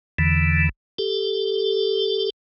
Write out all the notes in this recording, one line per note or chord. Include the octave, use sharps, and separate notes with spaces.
E2 D3 E3
G4 A4